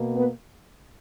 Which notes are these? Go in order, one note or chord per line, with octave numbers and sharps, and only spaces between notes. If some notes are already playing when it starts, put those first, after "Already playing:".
Already playing: B2 A#3
B3 B4